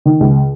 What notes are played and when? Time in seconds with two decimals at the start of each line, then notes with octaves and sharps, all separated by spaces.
0.05 D#3
0.20 C#2